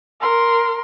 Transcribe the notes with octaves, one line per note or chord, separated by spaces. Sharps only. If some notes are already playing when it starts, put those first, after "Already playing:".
A#4 C6